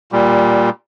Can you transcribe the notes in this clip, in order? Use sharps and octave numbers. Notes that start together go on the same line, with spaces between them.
A#2 G3